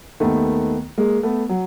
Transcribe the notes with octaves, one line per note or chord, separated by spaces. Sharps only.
D#2 D#3 A3 B3
G#3 A#3
A3 B3
F#3